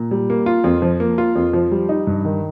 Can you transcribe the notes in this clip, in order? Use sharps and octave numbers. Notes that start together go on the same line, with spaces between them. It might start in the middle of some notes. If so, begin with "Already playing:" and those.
Already playing: A#2
G3
A#3
F4
F2
F3
A#3
F4
F2
F3
G3
D#4
G2
D#3